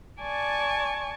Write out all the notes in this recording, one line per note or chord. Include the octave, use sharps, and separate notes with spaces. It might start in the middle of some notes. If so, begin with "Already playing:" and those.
D5 G#5 A5 C#6